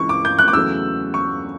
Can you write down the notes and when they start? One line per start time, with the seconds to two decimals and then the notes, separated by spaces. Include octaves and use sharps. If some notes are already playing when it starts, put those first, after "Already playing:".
Already playing: C#2 C#3 E3 C#6
0.09 D6
0.25 G6
0.39 F#6
0.48 D6
0.53 E2 C#3 F#3 A3 E6
1.14 C#6